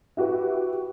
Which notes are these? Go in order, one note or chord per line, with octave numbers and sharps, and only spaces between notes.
E4 F#4 G4 B4